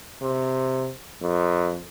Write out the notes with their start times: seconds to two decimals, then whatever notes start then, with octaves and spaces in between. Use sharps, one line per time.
0.22 C3
1.22 F2